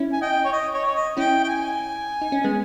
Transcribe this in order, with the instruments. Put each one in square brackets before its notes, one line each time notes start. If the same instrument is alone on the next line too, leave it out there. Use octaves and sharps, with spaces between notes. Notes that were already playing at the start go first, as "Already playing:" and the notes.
Already playing: [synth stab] C#4 E4
[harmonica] G#5
D#5 G5
C#5
D#5
C#5
C#5
D#5
[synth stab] C#4 E4 [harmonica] G5
[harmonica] G5
G#5
[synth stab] D#4
C#4
G#3 B3